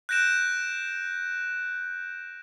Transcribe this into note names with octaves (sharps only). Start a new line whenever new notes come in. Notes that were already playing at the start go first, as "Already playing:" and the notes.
F#6 G6 A#6 D7 E7